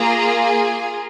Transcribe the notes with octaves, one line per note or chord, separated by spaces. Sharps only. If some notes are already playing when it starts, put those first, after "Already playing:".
Already playing: A#3 F4 G#4 A#5
G#5